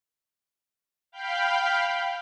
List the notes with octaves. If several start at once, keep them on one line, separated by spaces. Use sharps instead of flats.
F5 G5 B5 F6 G6